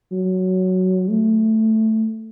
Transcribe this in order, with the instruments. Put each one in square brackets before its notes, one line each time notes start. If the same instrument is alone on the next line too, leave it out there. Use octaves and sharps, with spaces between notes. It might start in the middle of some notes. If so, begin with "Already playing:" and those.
[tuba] F#3
A3